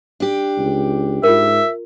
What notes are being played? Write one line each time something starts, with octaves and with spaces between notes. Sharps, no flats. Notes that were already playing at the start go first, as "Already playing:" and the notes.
D4 G4
C#2
G#2 F4 A#4 E5